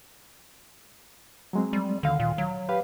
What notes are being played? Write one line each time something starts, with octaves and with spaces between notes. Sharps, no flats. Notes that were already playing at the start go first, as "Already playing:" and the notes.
F#3 G#3 C4
G3
D2 D3 D#3 F5
A#2
F#3
G4 B4 F5